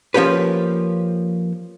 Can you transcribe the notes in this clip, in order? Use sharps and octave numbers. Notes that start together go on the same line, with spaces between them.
F3 A#3 C#4 G4 B4